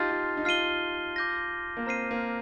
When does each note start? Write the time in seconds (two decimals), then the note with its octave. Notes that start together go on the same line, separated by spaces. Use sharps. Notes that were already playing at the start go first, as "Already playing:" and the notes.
Already playing: D#4 F4 G4 A5 C6 F6 A6 C7
0.10 F4
0.37 D#4
0.45 F4 F6 C7 D#7 G7
1.16 D6 G6 A#6
1.77 A#3
1.86 C4 A#5 F6 C7 D#7
2.11 A#3